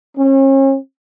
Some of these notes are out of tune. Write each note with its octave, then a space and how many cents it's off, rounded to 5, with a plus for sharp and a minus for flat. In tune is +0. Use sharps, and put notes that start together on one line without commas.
C#4 -40